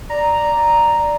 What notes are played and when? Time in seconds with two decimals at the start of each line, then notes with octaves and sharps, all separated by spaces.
0.10 D5 A#5